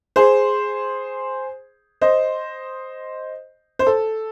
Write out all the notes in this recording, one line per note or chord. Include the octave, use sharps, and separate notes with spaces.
G#4 C5
C5 D#5
C5
A4